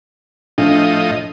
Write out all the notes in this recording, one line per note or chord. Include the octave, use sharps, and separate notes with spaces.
A2 F3 D4 D#5